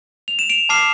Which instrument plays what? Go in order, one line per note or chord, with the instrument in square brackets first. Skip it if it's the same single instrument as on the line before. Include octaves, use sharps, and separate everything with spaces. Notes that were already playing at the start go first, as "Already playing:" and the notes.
[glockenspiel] F7
E7
D7 F7
A5 D6 F6 C7 E7